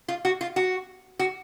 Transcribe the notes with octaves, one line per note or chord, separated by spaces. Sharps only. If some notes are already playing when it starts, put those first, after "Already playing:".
F4
F#4
F4
F#4
F#4